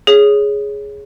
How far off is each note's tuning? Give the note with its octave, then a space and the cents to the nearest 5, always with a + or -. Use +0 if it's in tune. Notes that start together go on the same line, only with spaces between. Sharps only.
G#4 +0 C#5 +0